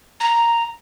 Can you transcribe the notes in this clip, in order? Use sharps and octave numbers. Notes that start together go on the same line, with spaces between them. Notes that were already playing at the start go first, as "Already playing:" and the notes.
A#5